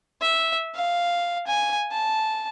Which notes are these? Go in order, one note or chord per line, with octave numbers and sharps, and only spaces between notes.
E5
F5
G#5
A5